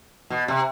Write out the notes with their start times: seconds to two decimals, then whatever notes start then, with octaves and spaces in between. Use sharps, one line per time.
0.30 B2
0.48 C3